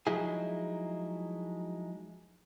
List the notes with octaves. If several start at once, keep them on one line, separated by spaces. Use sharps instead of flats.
F3 F#3 G#3 D#4 E4 G#4